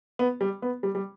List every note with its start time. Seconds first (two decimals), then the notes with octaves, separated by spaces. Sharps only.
0.19 B3
0.41 G3
0.62 B3
0.83 G3
0.95 G3